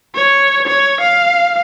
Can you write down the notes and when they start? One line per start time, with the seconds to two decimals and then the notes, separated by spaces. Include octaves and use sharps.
0.15 C#5
0.68 C#5
1.01 F5